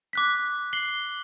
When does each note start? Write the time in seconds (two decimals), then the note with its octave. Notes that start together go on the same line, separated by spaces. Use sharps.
0.13 D6 F#6 B6
0.73 C7 F#7 G7